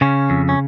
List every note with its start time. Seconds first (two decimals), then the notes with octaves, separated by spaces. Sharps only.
0.01 C#3 C#4
0.30 F2
0.49 C#4